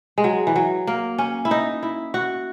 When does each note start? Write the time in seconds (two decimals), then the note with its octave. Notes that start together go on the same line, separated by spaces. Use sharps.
0.18 G#3
0.24 F#3
0.47 E3
0.56 F#3
0.87 A#3
1.18 C#4
1.45 E4
1.51 D#4
1.83 E4
2.14 F#4